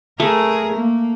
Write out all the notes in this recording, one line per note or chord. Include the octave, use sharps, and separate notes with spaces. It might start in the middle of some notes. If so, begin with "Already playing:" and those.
A3 G#4 A#4
A#3